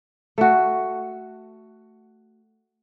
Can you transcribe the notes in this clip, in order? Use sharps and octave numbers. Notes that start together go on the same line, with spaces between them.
A3 F#4